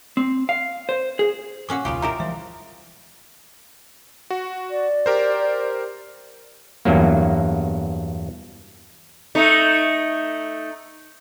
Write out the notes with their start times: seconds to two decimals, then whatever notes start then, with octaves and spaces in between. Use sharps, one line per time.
0.17 C4
0.49 F5
0.89 C5
1.19 G#4
1.69 A#2 C#4 F#4 F#5 D6
1.85 E1 C#2 E3 G3 D#4 F4 G4
2.02 D#4 E4 G4 A#4 E5 A#5
2.20 E3 F3 G3 G#3 E5
4.30 F#4
4.71 D5
5.06 G4 A#4 C5
6.85 E2 G2 F#3 A#3
9.35 A3 D#4